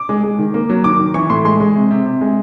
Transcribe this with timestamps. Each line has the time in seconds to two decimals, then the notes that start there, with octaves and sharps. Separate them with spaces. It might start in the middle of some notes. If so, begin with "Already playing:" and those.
Already playing: D6
0.09 G#3
0.24 G#3
0.39 D#3
0.54 A#3
0.70 F#3
0.84 D#3 D6
0.99 D#3
1.14 E3 C#6
1.30 A2 C6
1.45 G#3 C6
1.60 G#3
1.76 C3
1.91 C3
2.06 C3
2.21 G#3